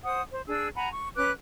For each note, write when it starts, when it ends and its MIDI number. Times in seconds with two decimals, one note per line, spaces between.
0.04 0.21 72
0.04 0.21 78
0.04 0.21 87
0.32 0.42 72
0.48 0.69 62
0.48 0.69 68
0.48 0.69 88
0.76 0.89 78
0.76 0.89 80
0.76 0.89 82
0.76 0.89 83
0.92 1.08 85
1.16 1.31 61
1.16 1.31 71
1.16 1.31 86
1.16 1.31 90